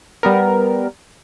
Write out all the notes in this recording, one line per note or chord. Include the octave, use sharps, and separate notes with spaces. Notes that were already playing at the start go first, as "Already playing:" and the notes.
G3 B3 A#4